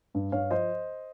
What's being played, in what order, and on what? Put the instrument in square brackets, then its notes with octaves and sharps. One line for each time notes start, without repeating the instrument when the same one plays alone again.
[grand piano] G2
G2 C#5 F5
F3 C5 D#5